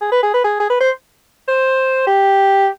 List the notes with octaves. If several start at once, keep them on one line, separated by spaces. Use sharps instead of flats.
G#4
B4
G#4
B4
G#4
G#4
B4
C5
C5
G4